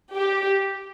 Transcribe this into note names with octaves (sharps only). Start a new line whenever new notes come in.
G4